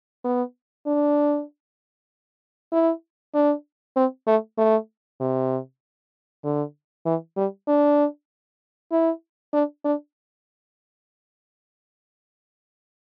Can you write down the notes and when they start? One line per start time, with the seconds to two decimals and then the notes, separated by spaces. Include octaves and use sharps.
0.24 B3
0.86 D4
2.72 E4
3.34 D4
3.96 C4
4.27 A3
4.58 A3
5.20 C3
6.44 D3
7.06 E3
7.37 G3
7.68 D4
8.92 E4
9.53 D4
9.85 D4